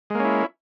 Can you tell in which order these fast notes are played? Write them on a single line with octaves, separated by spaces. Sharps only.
G#3 A#3 C#4 E4